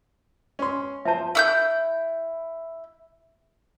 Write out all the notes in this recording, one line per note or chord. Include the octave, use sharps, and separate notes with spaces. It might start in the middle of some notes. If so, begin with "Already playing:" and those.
C#4 C6
F3 C5 E5 A5
E4 E6 G6